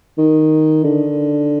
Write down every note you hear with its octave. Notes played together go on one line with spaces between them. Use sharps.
D#3
D3